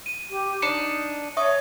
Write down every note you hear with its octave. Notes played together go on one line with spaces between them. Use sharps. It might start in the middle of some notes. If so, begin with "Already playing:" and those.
D#7
G4
D4 D#4 C#7
C#5 E5 C#6 D#6